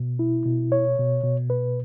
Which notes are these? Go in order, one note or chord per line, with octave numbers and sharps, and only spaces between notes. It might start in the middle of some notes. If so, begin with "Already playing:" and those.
Already playing: B2
E4
B2
C#5
B2
B2
B4